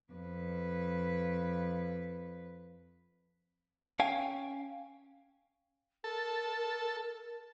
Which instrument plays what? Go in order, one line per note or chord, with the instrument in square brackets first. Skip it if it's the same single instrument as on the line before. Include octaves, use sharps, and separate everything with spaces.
[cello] F2 B4
[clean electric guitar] C#4 F5 G5 G#5
[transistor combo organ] A4 [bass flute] A#4